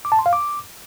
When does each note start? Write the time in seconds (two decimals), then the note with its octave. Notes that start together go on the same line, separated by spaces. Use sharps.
0.05 D6
0.12 A5
0.19 C6
0.26 F5
0.33 D6